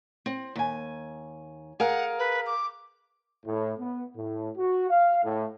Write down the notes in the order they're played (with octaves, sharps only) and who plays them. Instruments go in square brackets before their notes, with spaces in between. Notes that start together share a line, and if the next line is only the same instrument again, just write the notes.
[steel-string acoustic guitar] C4
D#2 G#5
[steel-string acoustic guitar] G#4 A#4 F5 [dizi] F#5
[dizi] B4
D6
[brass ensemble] A2
B3
A2
F#4
F5
A2